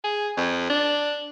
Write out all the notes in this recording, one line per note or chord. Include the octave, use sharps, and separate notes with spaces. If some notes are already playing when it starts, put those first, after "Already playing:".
G#4
F2
D4